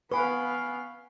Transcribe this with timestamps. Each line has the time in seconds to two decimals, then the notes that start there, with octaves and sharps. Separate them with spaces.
0.12 B3 B4 F5 F#5 G#5 C#6